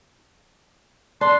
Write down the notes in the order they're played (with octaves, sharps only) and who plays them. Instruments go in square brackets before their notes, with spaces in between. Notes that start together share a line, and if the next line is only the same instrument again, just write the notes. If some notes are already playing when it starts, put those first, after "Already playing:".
[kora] D4 [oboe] C6